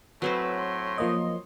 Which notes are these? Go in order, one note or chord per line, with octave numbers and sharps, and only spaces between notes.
A2 F#3 C4 B4 C5
C#5 C6
F3 A#3 D#5